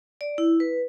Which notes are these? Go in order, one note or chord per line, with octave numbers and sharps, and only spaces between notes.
D5
E4
B4